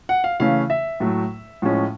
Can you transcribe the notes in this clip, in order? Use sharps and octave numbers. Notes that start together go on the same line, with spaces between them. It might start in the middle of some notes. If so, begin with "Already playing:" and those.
F#5
F5
C#3 E3 A3 C#4 F5
E5
A2 F#3 A3
A2 F3 G#3 C#4